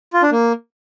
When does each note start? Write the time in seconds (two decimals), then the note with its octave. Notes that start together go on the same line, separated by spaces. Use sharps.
0.13 F4
0.22 D4
0.31 A#3